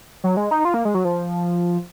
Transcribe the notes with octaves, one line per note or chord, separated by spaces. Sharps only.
F#3
G#3
D#4
F4
A#3
G#3
F#3
F3